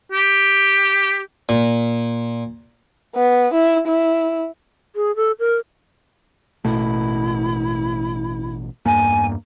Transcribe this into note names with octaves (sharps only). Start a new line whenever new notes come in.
G4
A#2
B3
E4
E4
G#4
A4
A#4
A1 B2 A3 E4
E2 G2 A#3 G#5